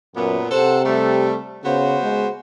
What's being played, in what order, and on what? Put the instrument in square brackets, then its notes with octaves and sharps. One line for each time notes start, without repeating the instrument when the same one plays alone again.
[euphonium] F#2 [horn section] A#2 B3
[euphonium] C3 [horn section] A4 C5 F#5
[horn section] G3 A3
[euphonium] C#3 [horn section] B3 F#4 C5
[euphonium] G#3